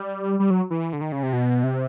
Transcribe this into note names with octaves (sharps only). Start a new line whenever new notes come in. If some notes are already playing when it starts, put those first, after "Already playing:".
Already playing: G3
G3
F#3
E3
D3
D#3
C#3
C3
B2
C3